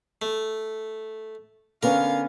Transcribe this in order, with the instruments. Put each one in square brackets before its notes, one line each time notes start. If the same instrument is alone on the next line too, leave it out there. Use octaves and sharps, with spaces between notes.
[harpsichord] A3
[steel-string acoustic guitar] D3 B3 C#4 [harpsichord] A#4 [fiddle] F5